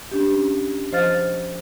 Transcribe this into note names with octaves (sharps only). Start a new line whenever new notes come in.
C#4 D4 G4
F3 C5 D#5 F5 F6 A6